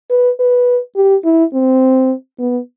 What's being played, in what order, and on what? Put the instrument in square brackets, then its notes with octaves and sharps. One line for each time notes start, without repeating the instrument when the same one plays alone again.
[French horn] B4
B4
G4
E4
C4
B3